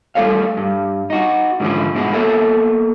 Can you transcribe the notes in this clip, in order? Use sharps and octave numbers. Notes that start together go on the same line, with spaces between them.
G3 A3 E4 A4 C#5 F5
G2
D#4 F#4
G#2 D3 E3 F3 C#4 E4
G#2 B2 E4 F#4 G#4
A#3 B3 A4 C#5 E5